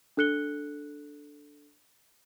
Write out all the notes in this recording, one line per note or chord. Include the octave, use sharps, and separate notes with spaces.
D4 A4 F#6 C#7 G7